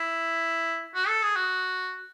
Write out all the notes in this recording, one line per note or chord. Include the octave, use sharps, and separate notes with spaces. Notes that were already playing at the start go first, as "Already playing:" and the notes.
Already playing: E4
F#4
A4
G#4
F#4